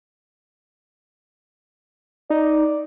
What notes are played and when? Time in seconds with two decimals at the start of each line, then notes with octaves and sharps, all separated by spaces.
2.30 D#4 D5